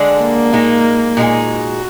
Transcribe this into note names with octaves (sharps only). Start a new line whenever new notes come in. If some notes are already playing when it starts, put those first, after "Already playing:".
Already playing: D3 G#3 D4 G#4
A#3
A#2 G#3 D#4
A#2 G#3 D#4 G#4
F#4